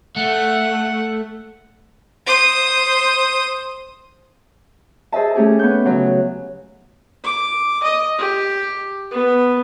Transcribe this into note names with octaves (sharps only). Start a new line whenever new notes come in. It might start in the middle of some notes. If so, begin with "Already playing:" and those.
A3 F#5
C5 D#6
G#4 C5 D#5 E5 A5
A3 C#4 G4 G#4 A5
B3 C#6 G6
C#3 F#3
D6
D#5
G4
B3